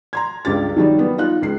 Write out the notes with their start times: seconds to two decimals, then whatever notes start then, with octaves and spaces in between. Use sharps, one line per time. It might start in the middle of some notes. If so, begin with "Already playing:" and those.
0.13 A#5 C6 G#6
0.45 C#2 G2 G4 A6
0.76 D#3 F#3 G3 D#4
0.99 G3 B3
1.18 D#4 F4 F#6
1.42 C#2 C7